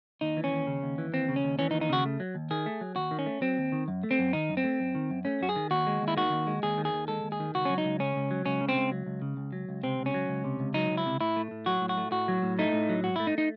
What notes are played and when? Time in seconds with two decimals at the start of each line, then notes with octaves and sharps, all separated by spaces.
0.21 D#2 D#4
0.37 E3
0.44 C#4
0.52 D#2
0.67 C#3
0.83 D#2
0.98 E3
1.13 D#2 C4
1.29 C#3
1.36 C#4
1.44 D#2
1.59 E3 C#4
1.71 D#4
1.74 D#2
1.81 D#4
1.89 C#3 F#4
2.05 A3
2.20 F#3
2.35 D#2
2.51 D#3 G#4
2.66 A3
2.81 F#3
2.96 D#2 F#4
3.11 D#3
3.19 C#4
3.26 A3
3.41 F#3 C4
3.58 D#2
3.72 D#3
3.88 F#2
4.03 A3
4.11 C4
4.19 F#2
4.33 D#3 D#4
4.49 F#2
4.57 C4
4.64 A3
4.80 F#2
4.95 D#3
5.10 F#2
5.25 A3 C#4
5.41 F#2 F#4
5.49 G#4
5.56 D#3
5.71 D#2 F#4
5.87 G#3
6.02 D#2
6.08 E4
6.17 D#3 F#4
6.32 D#2
6.47 G#3
6.63 D#2 G#4
6.78 D#3
6.85 G#4
6.93 D#2
7.08 G#3 A4
7.24 D#2
7.32 G#4
7.40 D#3
7.54 C#2 F#4
7.65 F#3 C#4
7.78 D#4
7.84 C#2
7.99 C#3 C#4
8.16 C#2
8.31 F#3
8.46 C#2 C#4
8.61 C#3
8.69 C4
8.76 C#2
8.91 F#3
9.06 C#2
9.22 C#3
9.37 C#2
9.53 F#3
9.69 C#2
9.83 C3 C4
9.99 C#2
10.06 C#4
10.14 F#3
10.29 C#2
10.44 C3
10.60 C#2
10.74 F#3 D#4
10.91 C#2
10.97 E4
11.06 C3
11.21 A2 E4
11.36 A3
11.51 A2
11.66 F#3 F#4
11.81 A2
11.89 F#4
11.97 A3
12.12 A2 F#4
12.28 F#3
12.42 A2
12.59 A3 D#4
12.73 A2
12.89 F#3
13.04 G#2 F#4
13.16 A3 E4
13.27 D#4
13.38 D#4